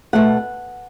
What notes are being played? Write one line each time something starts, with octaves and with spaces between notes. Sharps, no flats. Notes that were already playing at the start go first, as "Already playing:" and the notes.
B2 F#3 A3 F#5